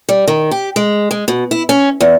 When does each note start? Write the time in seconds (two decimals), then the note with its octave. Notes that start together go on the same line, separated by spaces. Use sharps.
0.09 G3
0.28 D#3
0.51 G4
0.76 G#3
1.11 G#3
1.28 B2
1.51 E4
1.69 C#4
2.01 E2